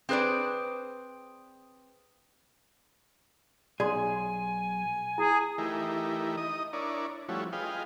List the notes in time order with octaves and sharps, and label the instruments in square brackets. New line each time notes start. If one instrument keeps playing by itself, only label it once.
[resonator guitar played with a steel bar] C4 G#4 B4 C5 D5
[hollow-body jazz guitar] B1 G#4 [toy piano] D5 C6 [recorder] G#5
[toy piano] E4 [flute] G#4
[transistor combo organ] E3 A3 D#4 E4 G4 A#4
D#4 D#5 D#6
D4 E4 A#4 C#5 D5
F3 G3 A3 C#4 E4 F#4
F4 G#4 B4 D#5 F5 G5